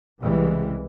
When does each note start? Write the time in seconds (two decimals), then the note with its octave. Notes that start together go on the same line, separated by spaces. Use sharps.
0.20 C2 C#3 E3 G3 G#3